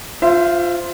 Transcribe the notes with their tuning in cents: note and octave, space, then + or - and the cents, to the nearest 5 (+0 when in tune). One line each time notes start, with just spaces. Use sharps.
F4 +0 C5 -10 E5 +30